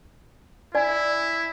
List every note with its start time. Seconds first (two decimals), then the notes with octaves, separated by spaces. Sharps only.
0.75 E4 D5 G#5